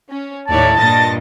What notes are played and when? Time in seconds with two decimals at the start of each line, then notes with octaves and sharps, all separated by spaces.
0.11 C#4
0.48 D#2 A2 E4 C#5 D5 A5
0.78 G2 A#2 D#5 A6 A#6